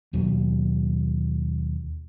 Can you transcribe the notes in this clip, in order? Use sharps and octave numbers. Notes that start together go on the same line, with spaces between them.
D#2 B2 F#3